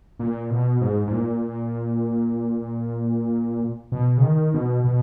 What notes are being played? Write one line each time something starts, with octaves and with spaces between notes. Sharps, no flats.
A#2
B2
G#2
G#2
A#2
B2
C#3
D#3
B2
B2